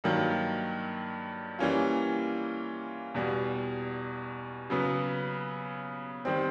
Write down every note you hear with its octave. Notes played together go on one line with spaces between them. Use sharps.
G2 D#3 F#3 A#3
E3 G3 A#3 C#4 F4
E2 B2 G3
C#3 F#3 B3
D#3 G3 C4